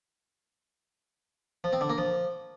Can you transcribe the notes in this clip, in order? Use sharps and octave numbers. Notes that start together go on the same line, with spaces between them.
F3
C4
D3
A#3
F3